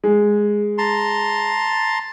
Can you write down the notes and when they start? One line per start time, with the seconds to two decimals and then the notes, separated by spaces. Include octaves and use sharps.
0.04 G#3
0.78 A5 A#5 C6